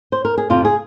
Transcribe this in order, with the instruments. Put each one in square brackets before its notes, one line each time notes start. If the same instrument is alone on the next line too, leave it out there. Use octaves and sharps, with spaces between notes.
[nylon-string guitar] C5
A#4
G#4
F2 C3 F3 F4
G#4